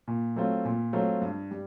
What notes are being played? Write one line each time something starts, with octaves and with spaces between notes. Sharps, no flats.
A#2
F#3 A3 C4 F4
A#2
F#3 A3 C4 F4
G2
G3